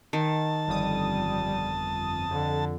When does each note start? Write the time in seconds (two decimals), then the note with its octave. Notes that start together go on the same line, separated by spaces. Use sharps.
0.13 D#3 A5
0.68 G1 F2 G3 D#6
2.31 F2 D3